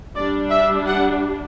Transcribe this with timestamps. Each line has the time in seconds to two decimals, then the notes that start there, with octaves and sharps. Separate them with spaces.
0.16 G3 D4 D5
0.50 E5
0.87 F#5